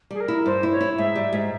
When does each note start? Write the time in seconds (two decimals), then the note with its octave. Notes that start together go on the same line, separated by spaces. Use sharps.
0.11 G3 G#4
0.20 A#4
0.28 E4
0.45 G2 C5
0.63 E4
0.71 C#5
0.80 E4
0.97 G#2 E5
1.16 G3
1.33 G#2